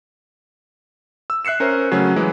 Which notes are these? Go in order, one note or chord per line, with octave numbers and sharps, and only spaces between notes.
E6
E5 F#6 C7 C#7 E7
C#4 A#4 C5
C#3 F#3 A3 C#4
E3 F#3 G#3